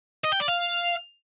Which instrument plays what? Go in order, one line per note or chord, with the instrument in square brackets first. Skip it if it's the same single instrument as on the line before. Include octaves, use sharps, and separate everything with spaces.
[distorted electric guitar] D#5
G5
D5
F5